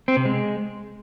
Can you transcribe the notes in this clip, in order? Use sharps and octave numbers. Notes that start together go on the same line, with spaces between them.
C4
C3
G#3